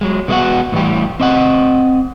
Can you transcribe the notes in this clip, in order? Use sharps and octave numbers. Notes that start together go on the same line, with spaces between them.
F#3 G#3
D#3 G#3 B3 E4 F#4 F#5
A2 E3 G3 G4
C4 D#5 F#5